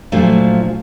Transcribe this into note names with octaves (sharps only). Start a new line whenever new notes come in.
A#2 F3 F#3 A3 D4